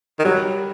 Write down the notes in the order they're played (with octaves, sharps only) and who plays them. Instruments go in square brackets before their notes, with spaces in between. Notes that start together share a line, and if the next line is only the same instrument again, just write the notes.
[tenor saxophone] D#3
[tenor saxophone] F#3 [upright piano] G3